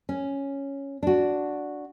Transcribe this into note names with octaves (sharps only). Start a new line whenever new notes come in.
C#4
D4 F#4